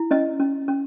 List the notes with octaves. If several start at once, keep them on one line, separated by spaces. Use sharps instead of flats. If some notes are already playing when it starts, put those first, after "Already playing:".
Already playing: E4
C#4 D#5
C#4
C#4